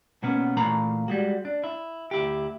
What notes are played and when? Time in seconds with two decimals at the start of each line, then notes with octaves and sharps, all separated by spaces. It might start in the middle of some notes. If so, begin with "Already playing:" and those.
0.23 B2 A#3 B3 C#4
0.57 A#2 E3 A3 A#3 A#5 B5
1.08 G3 G#3 F#4
1.45 D4
1.64 E4
2.11 D2 E4 G4